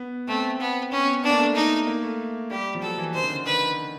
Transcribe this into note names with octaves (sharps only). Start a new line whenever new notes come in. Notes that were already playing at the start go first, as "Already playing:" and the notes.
Already playing: B3
A3 C4
B3
B3 C#4
B3 D4
A#3
A3
A#3
D#4
A#3
A3
G3 G4
F3
F#3 A4
E3
D#3 C5
C#3
D3
D#3 B4